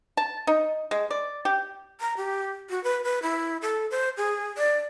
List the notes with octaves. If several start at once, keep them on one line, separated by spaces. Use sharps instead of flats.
A5
D#4
G#3
D5
G4
A#5
G4
F#4
B4
B4
E4
A4
C5
G#4
D5